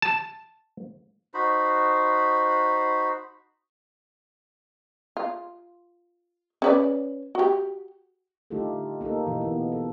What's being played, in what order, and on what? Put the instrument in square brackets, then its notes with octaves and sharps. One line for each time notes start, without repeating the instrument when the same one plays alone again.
[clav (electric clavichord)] A5
[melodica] D#4 F#4 C5 B5
[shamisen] F4
C#4 B4 D5
F#4 G4
[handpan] D3 A3 D#4 F4 G4 A4
A#3 D#4 G4 A4
B2 E3
B3
A4